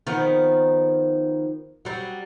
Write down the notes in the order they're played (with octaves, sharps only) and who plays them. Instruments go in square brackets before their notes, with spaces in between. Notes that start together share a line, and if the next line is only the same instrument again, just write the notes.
[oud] D#3 F3 B3
F#3 G3